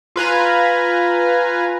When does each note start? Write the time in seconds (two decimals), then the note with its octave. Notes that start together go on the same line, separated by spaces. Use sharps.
0.16 F4 B4 G#5 A#5